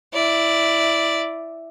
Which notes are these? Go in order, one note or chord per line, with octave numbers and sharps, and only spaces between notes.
E4 D5